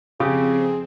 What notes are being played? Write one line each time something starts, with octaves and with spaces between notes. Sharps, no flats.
F2 C#3 C4 G4 G#4 D#6